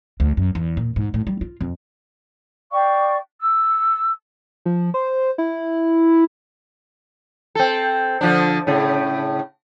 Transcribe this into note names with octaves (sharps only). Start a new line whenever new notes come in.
D2
F#2
E2
A#2
G#2
A2
G3
F4
F2
D5 F5 G5 C#6
E6
F3
C5
E4
C4 A4
D3 F3 D4
A2 C#3